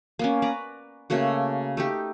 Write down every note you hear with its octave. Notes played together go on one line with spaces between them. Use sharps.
A#3 B3 C#4
B4 D5 A#5
C#3 A3 A#3 F#4
A3 D#4 G4